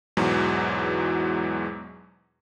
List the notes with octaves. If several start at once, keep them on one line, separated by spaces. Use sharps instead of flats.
E2 G#2 B2 E3 F#3